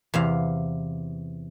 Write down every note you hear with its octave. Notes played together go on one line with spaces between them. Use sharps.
E2 C3 F5